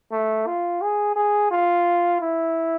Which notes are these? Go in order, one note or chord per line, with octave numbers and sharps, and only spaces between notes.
A3
F4
G#4
G#4
F4
E4